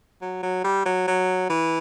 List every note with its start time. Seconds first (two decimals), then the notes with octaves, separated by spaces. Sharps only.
0.21 F#3
0.43 F#3
0.64 G3
0.85 F#3
1.07 F#3
1.49 E3